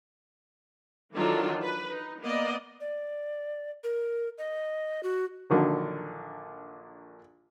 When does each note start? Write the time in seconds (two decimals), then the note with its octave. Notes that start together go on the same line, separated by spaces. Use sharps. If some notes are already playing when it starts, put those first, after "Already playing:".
1.15 D#3 E3 F#3 D4 F4 A4
1.62 B4
1.91 D#4
2.23 A#3 B3 D5 D#5
2.81 D5
3.84 A#4
4.38 D#5
5.03 F#4
5.50 A#1 D3 D#3 F#3